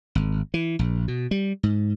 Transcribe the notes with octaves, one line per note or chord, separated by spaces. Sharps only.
G#1
E3
A#1
B2
G3
G#2